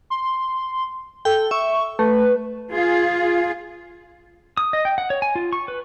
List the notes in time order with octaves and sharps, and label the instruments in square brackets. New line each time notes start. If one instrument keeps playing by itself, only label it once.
[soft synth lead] C6
[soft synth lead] A4 [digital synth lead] G5
[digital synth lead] E5 [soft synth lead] C#6
[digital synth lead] A3 [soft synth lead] B4
[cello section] F4 G#4
[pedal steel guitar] D#6
D#5
G5
F#5
C#5
G#5
F4
C#6
B4